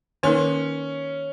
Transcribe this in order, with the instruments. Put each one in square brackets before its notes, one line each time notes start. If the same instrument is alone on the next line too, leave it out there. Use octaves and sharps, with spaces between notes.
[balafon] D#3 A#3 D#4 A#4 [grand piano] C#4